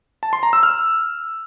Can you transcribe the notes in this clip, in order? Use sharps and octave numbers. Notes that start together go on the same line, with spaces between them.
A5
C6
A#5
E6
F6